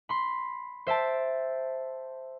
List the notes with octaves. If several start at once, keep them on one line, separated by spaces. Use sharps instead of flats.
B5 C6
C5 E5 G5 A5